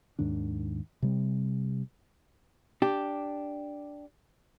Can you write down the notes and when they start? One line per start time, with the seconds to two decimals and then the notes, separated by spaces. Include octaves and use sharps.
0.19 D#2 G#2 D#3 D4
1.02 C3 G3 C4
2.82 D4 G4